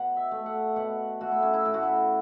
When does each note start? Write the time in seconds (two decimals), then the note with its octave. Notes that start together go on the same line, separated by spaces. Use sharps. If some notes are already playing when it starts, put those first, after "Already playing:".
Already playing: B2 F#5
0.16 E5
0.31 A3
0.46 F#5
0.76 B2 F#5
1.21 A3 F#4
1.31 E4
1.42 C#4
1.53 E4
1.65 A2 E4
1.74 F#4
1.83 E4